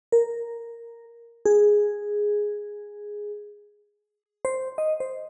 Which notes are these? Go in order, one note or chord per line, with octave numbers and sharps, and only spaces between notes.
A#4
G#4
C5
D#5
C5